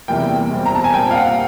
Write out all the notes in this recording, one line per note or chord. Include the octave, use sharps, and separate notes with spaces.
E2 C3 E3 G3 A#3 G5
E2 B2 G3 C4
A#5
A5
G#5
A#2 G3 C4 G5
F5
F#5